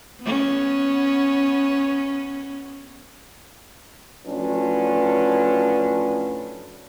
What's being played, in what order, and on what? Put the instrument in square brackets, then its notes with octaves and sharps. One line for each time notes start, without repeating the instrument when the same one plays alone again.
[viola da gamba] B3 C#4
[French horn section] A2 F3 F#3 C#4 D4 B4